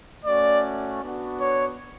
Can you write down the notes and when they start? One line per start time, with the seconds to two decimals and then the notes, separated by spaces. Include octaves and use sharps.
0.25 A3 C#4 F#4 D5
1.01 B3 D4 F#4
1.41 C#5